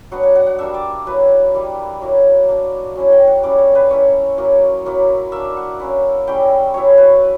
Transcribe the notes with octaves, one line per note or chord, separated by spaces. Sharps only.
F#3 B3 D4 F#5
F#5
F#5
F#5
G3 A#3 D4 E5
D5
F#3 A#3 E4 B4
G3 A#3 E4
F#3 A#3 E4
A#3 D4
F#3 C#4 E4
G5
F#5
G3 C#4 E4 D5
C#5
B4
A#3 C#4 E4 C#5
F#3 A#3 E4
F#3 A#3 E4
A#3 D4 E5
F#5
A#3 C#4 E4
G3 C#4 E4 G5
F#3 B3 E4 C#5
B4
E4